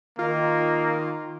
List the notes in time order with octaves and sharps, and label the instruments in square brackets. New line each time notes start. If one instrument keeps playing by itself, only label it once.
[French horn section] D#3 [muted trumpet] A#3 [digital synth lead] F4